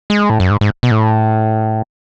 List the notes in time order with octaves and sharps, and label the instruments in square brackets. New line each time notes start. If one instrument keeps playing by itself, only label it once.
[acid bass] G#3
A2
F#2
G#2
G#2
B2
A2